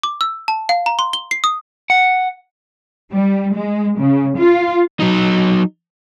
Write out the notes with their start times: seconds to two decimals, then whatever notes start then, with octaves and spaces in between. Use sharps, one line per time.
0.03 D6
0.21 E6
0.48 A5
0.69 F5
0.86 A#5
0.99 C6
1.13 G7
1.31 C7
1.44 D#6
1.90 F#5
3.12 G3
3.54 G#3
3.99 C#3
4.37 F4
5.00 F#3 D#4